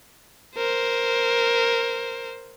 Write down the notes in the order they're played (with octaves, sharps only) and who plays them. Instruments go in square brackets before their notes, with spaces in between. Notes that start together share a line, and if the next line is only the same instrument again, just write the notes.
[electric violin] A#4 C5